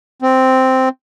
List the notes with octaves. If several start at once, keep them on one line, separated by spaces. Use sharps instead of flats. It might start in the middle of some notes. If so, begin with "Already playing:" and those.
C4